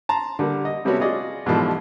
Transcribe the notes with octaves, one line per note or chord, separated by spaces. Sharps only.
A5 A#5 C6
D3 G3 A#3
D#5
C3 G3 A3 B3 C#4 F#4
F4 F#4 G#4 D5 D#5
G#2 B2 E3 F3 G3 A3